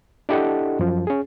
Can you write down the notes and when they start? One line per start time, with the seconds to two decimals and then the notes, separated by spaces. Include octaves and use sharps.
0.29 D4 E4 G4 A4 D#5 F#5
0.79 F#2 F3
1.07 C#4 G#4